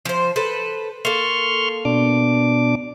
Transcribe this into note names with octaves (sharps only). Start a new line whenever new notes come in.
F3 C5
A4 B4 C5
A#3 A4 C6 C#6 F6
B2 D4 D6